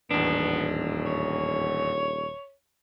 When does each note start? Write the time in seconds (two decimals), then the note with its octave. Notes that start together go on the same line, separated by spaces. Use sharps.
0.11 D#1 A1 E2 B3 D4
1.06 C#5